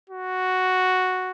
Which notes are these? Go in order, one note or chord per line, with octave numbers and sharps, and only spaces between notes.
F#4